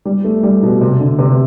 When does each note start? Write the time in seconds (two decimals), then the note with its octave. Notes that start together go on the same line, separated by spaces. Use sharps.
0.05 G3
0.24 A3
0.43 G3
0.63 B2
0.81 C3
1.00 D3
1.19 C3